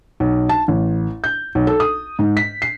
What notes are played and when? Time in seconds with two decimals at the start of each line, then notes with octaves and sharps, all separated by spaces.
0.20 B1
0.49 A5
0.68 A1
1.24 G6
1.55 B1
1.67 A4
1.80 D#6
2.19 G#2
2.37 B6
2.62 C7